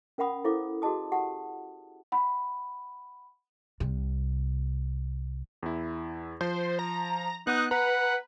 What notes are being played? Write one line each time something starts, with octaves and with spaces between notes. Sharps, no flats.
C#4 A#4 F5 F#5 B5 D#6
E4 A4 C5 F5 D6
F#4 G#4 D#5 A5 D#6
G4 F#5 A5 D#6
F#5 B5
C2 C3
E2 E4
F3 C5
A#5
B3 D#4 F#5 D#6 F#6
B4 F#5 A#5